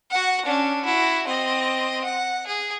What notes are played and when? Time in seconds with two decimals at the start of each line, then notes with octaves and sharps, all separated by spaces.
0.10 F#4 F#5
0.46 C#4 D4
0.85 E4 F#4
1.27 C4 D#5
2.04 F#5
2.47 G#4